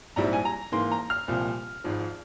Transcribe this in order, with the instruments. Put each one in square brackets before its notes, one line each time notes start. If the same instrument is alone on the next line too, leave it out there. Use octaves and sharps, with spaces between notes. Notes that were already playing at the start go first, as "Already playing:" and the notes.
[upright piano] A#1 G#2 G3 C4 E4 A#5
G#5
A#5
G#2 E3 A#3 C6
A#5
F6
C2 A#2 F3
G#1 G#2 F3